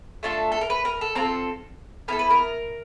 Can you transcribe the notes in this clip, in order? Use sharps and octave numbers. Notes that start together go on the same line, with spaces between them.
A3 D4 F4 A4
A4
A#4
B4
A#4
A4
C4 F4 A4 A#4
B3 E4 A4 A#4
B4
A#4